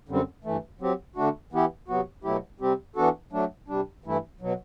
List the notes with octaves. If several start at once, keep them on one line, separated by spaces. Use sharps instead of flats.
F#2 D3 G3 C4
G2 E3 A3
F#3 C4 G4
D3 A3 D4 F#4
E3 B3 E4 G4
C3 F#3 B3 F#4
B2 F#3 A3 E4 G4
C3 G3 C4 G4
E3 B3 D4 F#4 A4
F#3 A3 D4
C3 G3 D4
G2 E3 A3 E4
B2 F#3